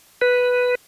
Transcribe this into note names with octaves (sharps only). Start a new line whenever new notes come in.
B4